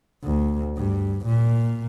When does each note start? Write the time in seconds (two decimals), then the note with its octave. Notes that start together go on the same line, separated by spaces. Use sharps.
0.24 D2
0.77 G2
1.26 A#2